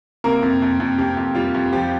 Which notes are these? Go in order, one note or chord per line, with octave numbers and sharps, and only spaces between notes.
C3 A#3 A#4
F2
F2
F2
F2 G4
F2
G3 F4
F2
F3 G4